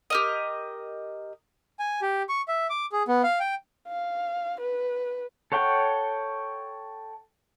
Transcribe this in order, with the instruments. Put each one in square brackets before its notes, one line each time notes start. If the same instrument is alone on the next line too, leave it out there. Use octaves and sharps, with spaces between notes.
[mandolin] G4 A#4 D#5
[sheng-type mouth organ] G#5
G4
C#6
E5
D6
G#4
B3
F5
G5
[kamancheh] F5
B4
[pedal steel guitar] A4 C#5 F#5 G5